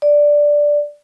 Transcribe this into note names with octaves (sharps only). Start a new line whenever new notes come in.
D5